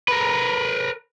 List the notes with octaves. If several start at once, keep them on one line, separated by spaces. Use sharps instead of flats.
A#4 B4